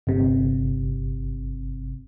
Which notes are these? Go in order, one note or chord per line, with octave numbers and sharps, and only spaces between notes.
G1 C3